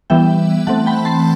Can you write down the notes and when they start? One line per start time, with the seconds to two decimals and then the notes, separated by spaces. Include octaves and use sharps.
0.10 E3 G3 B3 E5 G5
0.67 E3 A3 C4 F#5 A5
0.86 G5 B5
1.05 A5 C6